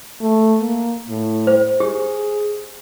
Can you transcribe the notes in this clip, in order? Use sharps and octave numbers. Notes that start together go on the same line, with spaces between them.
A3
A#3
A2
C5
G4 G#4